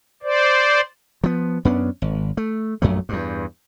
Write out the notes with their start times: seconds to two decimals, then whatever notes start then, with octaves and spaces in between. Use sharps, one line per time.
0.23 C5 D5
1.24 F3 B3
1.65 F#2 B3 C#4 D4
2.02 G#1
2.37 A3
2.82 A#1 F#2 F#3 A3
3.09 E2 G2